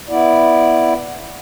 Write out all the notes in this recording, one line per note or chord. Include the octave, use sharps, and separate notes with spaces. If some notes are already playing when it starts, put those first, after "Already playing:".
B3 E4 D5